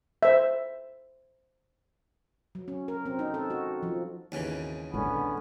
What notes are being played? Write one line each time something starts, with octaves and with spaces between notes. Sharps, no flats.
C5 E5
F#3
C#4
A#4
C4
D#4
A4
F#4
F3
G#1 D#2 C#3 E3
A#1 D3 G#3 B3 C#4